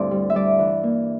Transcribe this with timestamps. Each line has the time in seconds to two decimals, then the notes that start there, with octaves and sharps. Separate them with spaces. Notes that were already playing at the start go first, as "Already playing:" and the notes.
Already playing: D2 G2 C4 E4 C5 D5
0.11 G3
0.30 E5
0.35 G3 D5
0.59 E3
0.83 A#3